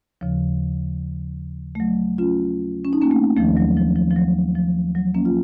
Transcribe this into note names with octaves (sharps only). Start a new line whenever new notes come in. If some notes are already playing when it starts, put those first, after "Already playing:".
D#2 C#3 F3
A3
F#3
C#4 F4
C#4
D#4
A#3 C#4
A3 C4
D#2 D#3 F3 A3
F#3
F3
F3
F3
F#3
F3
F#3
A#3 C#4
F4